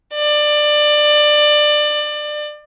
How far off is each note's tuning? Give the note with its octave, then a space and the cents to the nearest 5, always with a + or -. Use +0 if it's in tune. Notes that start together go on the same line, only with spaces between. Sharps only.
D5 +20